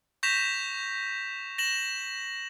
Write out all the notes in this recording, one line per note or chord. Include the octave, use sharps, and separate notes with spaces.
C#6 G6 A#6 B6 E7 F7
A#6 E7 F#7